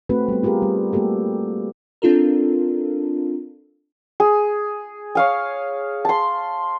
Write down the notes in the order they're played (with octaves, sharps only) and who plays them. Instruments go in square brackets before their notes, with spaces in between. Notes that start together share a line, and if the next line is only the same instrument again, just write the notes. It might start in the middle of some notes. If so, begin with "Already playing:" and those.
[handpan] A3 C4 F#4 B4
G3 B3
F4 G4 G#4 A#4
G3
A3 A#3 F#4 G4 A4
[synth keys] C4 D4 F4 A4 A#4
[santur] G#4
C#5 F5 G#5
A5 C6